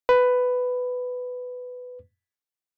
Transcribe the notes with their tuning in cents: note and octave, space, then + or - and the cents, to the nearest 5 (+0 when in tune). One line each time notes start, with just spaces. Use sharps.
B4 +10